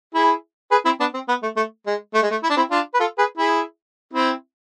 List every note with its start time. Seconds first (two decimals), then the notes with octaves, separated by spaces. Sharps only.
0.14 E4 G#4
0.71 G#4 B4
0.85 C4 E4
1.00 B3 D4
1.14 C4
1.28 B3
1.43 A3
1.57 A3
1.86 G#3
2.14 A3
2.22 G#3
2.31 A3
2.43 E4
2.50 D4
2.57 C4 E4
2.71 D4 F4
2.94 B4
3.00 F4 A4
3.18 G#4 B4
3.37 E4 G#4
4.13 C4 E4